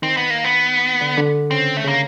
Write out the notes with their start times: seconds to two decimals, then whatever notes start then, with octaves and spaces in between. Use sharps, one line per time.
0.02 D#3 C4 D#4
0.17 B3
0.30 A#3
0.44 B3
1.01 D3 D4
1.17 D3 D4
1.51 C#3 C4 C#4
1.77 A3
1.84 C#3 A#3 C#4